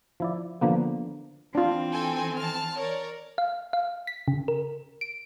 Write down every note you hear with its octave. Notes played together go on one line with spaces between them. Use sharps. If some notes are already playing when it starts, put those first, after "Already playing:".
F3 E4 D5
D3 F3 A#3 B3
E3 C4 D4 F4
A4 G5 G#5
A5 F6
A#4 C#5 D5
F5
F5
B6
C#3
A#4
D7